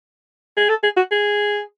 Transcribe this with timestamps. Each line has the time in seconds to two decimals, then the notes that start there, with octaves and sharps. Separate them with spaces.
0.57 G#4
0.69 A4
0.83 G#4
0.97 F#4
1.11 G#4